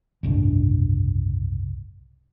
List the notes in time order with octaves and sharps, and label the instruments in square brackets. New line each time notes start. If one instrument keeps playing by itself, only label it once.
[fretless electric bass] F#1 C2 G#2 D4